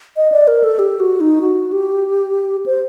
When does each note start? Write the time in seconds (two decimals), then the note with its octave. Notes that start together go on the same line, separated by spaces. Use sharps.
0.16 D#5
0.32 D5
0.48 A#4
0.64 A4
0.79 G4
1.00 F#4
1.21 D#4
1.42 F#4
1.72 G4
2.66 C5